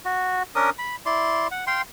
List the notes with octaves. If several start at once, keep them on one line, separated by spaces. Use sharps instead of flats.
F#4
C#4 D4 A#4 D#6
B5
E4 D5 C6
F#5
F5 G5 C6